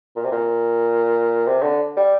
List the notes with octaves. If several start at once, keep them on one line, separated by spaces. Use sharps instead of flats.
A#2
C3
A#2
C3
D3
G3